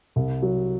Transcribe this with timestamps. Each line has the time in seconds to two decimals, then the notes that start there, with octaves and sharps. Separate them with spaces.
0.16 C2
0.42 F#3